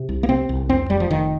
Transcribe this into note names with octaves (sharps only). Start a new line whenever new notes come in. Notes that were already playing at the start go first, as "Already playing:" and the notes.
Already playing: C3
C2
A#3
C3 C4
C2
F2 C4
F1 G3
F3
F1 D#3